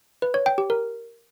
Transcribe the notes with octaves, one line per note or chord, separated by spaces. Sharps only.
B4
C#5
G5
G4
A#4